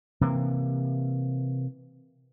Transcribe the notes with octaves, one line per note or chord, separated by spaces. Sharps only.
C3 E3 A#3